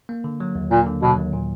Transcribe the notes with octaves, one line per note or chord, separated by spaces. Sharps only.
A#3
D3
F#3
D#2
A#2 A#3
D3
B2 F#3
D#2
A#2